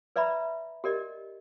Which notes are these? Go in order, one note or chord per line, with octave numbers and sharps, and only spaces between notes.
B4 D5 E5 A#5 B5
G4 A#4 D5 D#5